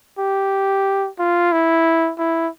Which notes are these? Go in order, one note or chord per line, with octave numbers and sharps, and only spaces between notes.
G4
F4
E4
E4